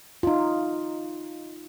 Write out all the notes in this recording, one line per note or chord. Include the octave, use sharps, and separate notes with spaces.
D#4 F4